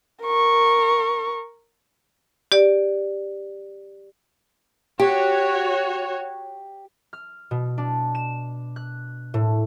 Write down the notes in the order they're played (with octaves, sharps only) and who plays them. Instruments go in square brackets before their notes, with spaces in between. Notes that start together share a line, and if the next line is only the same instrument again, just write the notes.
[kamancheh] A#4 C#6
[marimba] G4 D5
[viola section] F#4 C#5 [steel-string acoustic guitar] G4
[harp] F6
B2
D4
E7
F#6
A2